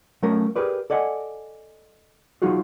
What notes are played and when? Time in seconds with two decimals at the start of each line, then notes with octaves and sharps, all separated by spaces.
0.23 F#3 A3 C#4 A#4
0.56 G4 G#4 A#4 B4 D5
0.90 A4 D5 D#5 F#5 G#5
2.42 F#3 D#4 F4 F#4 G#4